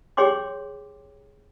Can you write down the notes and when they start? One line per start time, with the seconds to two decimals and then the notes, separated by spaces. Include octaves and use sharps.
0.17 G4 G#4 C#5 G5 C6 D6